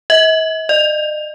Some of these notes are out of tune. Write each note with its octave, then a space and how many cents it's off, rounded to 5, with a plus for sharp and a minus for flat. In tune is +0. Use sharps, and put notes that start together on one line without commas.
D#5 +45
D#5 -45